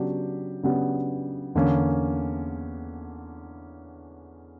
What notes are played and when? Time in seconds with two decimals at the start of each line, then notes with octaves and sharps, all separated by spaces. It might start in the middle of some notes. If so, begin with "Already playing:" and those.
Already playing: C#3 F#3 B3 D4 G4
0.63 C#3 F#3 B3 D4 G4
1.55 E2 D3 A#3 C#4